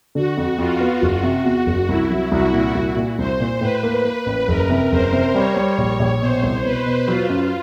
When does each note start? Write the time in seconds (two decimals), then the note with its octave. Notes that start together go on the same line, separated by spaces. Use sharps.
0.15 D3 F#4
0.37 F2
0.58 F2 F4
0.80 B3
1.01 F#1 F#4
1.23 C3
1.44 E2
1.66 F#1
1.88 C2 E4
2.10 F#3
2.31 C2 F#4
2.53 A#2
2.75 C2
2.96 A#2
3.18 C2 C5
3.40 A#2
3.61 A2 B4
3.83 A#3
4.04 A#3 B4
4.26 A1
4.48 F#1 A#4
4.70 C3
4.91 F#1 C5
5.13 C3
5.34 G3 C#5
5.56 G3
5.78 A#1
5.99 A#1
6.22 B2 C5
6.43 C2
6.64 B2 B4
6.86 B2
7.08 F#3 F4
7.29 F#2